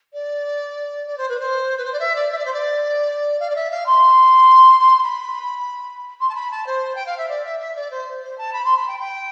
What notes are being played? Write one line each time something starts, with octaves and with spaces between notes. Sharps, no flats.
D5
D5
C5
B4
C5
B4
C5
D5
E5
D5
E5
D5
C5
D5
F5
D5
E5
F5
C6
C6
C6
B5
C6
A5
B5
A5
C5
G5
F5
E5
D5
E5
E5
D5
C5
C5
A5
B5
C6
B5
G5
G5